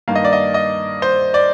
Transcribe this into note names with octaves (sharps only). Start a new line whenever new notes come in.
G2 D#3 A#3 F5
D#5
D5
D#5
D#5
C5
D5